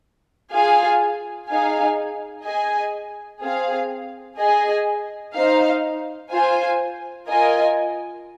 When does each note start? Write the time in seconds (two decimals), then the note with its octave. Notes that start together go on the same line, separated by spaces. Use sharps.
0.51 F4 G#4 F5 G#5
1.49 D#4 G#4 F5 G#5
2.44 G#4 D#5 G#5
3.41 C4 G#4 F5
4.38 G#4 D#5 G#5
5.34 D#4 C5 F5
6.31 F4 C5 G#5
7.28 F4 A#4 D#5 G#5